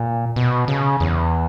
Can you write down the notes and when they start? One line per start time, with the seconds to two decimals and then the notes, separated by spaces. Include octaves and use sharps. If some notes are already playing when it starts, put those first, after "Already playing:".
Already playing: A#2
0.36 B2
0.68 C#3
1.00 E2